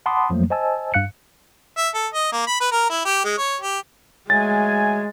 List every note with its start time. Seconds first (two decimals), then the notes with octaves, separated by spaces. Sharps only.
0.06 F#5 A5 B5 C6 D6 D#6
0.30 F2 F3 F#3 A3 A#3
0.50 C5 D#5 G#5 A5 E6
0.94 G2 F5 F#6 C#7
1.77 E5
1.95 A4
2.14 D#5
2.32 A#3
2.47 B5
2.60 B4
2.72 A#4
2.89 E4
3.05 G4
3.24 G#3
3.38 C#5
3.61 G4
4.30 F#3 G#3 A3 G#5 A6